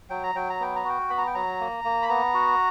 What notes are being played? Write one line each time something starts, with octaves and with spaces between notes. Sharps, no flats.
F#3 G5
A#5
F#3 G5
A#5
B3 G5
A#5
F#4 G5
B3 B5
A#5
G5
F#3 A#5
A#3
A#3
B5
B3 A#5
F#4